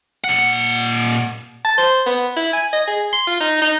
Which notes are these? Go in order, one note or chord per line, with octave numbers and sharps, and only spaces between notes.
A#2 F#5
A5
C5
B3
E4
G#5
D#5
G#4
C6
F4
D#4
D#4